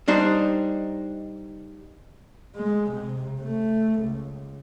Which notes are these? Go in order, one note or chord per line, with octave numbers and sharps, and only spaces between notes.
G3 D4 D#4 C5
G#3
C3
A3
C#2